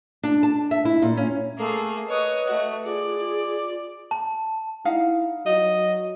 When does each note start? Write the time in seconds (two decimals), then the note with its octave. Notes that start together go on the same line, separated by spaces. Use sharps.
0.23 D4
0.43 A5
0.71 E5
0.85 E4
1.02 A#2
1.17 C#4
1.58 A3 A#3 G#4
2.08 B4 C#5 D#5 D#6
2.47 A3 F#4
2.84 F4 G#4 D5
3.17 F4
4.11 A5
4.85 D#4 E4 F5 F#5
5.46 F#3 D#5